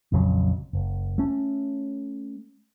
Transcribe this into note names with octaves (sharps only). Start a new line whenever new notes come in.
A#1 F2 C#3 F#3
F#1
A3 C#4